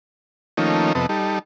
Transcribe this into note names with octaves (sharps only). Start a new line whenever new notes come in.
D#3 F3 A3 A#3 C#4 D#4
F2 C3 B3 A4 D#5
G3 D#4 A4